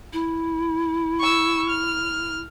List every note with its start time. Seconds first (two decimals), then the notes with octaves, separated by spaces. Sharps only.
0.13 E4
1.20 C#6 E6
1.69 F6